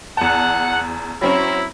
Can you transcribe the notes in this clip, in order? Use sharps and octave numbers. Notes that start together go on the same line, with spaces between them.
E2 F#5 A5
F#3 C4 C#4 E4